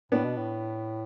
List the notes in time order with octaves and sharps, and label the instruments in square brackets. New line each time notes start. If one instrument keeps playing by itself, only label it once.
[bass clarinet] A2 [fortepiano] B3 D4
[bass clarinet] B2
A2